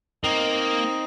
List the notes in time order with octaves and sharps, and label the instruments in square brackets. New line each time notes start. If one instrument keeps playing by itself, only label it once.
[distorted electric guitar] A#3 [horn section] C4 D#4